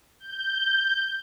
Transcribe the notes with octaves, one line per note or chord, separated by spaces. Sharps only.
G6